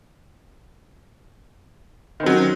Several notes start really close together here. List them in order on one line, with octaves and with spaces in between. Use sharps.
D#3 C4 F#3 C#4